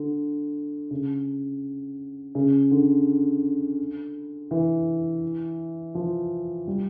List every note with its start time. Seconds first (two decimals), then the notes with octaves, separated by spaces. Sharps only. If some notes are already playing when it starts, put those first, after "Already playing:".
Already playing: D3
0.91 C#3
2.35 C#3
2.71 D3
4.51 E3
5.95 F3
6.67 G3